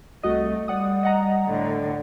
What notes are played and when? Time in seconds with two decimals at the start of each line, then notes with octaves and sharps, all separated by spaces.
0.23 C2 A3 F#4 D#5
0.68 G3 D5 F#5 D#6
1.03 D#5 F#5 A#5
1.47 A2 D3